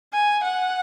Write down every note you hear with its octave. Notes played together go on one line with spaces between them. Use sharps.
G#5
F#5